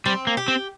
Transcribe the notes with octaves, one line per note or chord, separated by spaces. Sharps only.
G3 C4
A#3
G4
C4